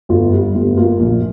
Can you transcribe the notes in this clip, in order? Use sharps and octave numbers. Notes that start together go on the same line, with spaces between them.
G1 F4
G3
G1
A#3 F4
A#1